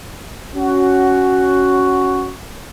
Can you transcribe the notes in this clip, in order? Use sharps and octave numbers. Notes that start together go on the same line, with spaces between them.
C#4 F#4